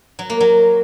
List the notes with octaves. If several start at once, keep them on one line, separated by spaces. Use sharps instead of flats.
F#3
A#3
F#3